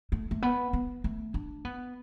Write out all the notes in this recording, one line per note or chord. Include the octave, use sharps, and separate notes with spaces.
A3
A3
B3
B3
A3
D4
B3